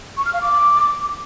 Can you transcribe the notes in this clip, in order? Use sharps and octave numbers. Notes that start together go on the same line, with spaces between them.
C#6
F6
F5
D6